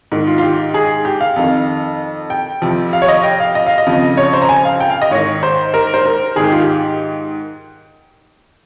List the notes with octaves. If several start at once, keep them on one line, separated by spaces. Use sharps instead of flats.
G#2 D#3
F4
F4
G4
G#4
G4
F5
F2 D#3
G5
F2 C3 F3
F5
C#5
D#5
G5
F5
D#5
F5
D#5
F2 C#3 F3
C#5
C5
A#5
G#5
F5
G5
F5
D#5
G#2 D#3 C#5
C5
A#4
C5
A#4
G#2 D#3 G4 G#4
F4
G4